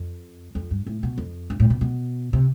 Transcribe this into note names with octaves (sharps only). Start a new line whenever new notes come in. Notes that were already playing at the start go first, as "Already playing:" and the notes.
Already playing: F2
F2
G2
A2
B2
F2
G2
A2
B2
B2
C3